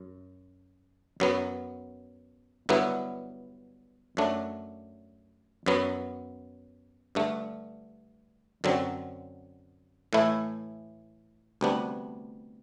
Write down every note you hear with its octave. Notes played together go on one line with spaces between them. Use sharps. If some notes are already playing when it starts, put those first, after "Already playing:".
Already playing: F#2
F#2 F#3 B3
G2 D3 F#3 B3 E4
F#2 F#3 A3 D4
F#2 F#3 B3
G2 D3 A3
F#2 D3 F#3 C4
A2 E3 A3 E4
D2 C3 G3 B3 D4